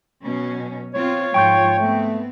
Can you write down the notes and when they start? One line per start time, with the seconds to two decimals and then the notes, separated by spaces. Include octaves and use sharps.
0.24 B2 F#3 C#4
0.94 C4 F4 C#5
1.34 G#2 F3 F4 G5 C#6 G6
1.79 A3 B3 C4